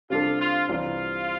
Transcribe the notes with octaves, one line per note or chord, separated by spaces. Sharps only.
C3 G3 D4 F4 A4
F4
C2 C3 E3 F4